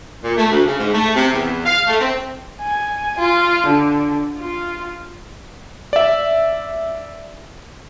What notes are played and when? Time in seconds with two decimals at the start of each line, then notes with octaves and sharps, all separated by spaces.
0.23 A#2
0.37 A3
0.50 D2
0.66 C#3
0.79 G#2
0.94 A3
1.15 C3
1.33 E2
1.66 F5
1.87 A3
2.00 C4
2.62 G#5
3.19 F4
3.67 D3
4.38 F4
5.93 D5 E5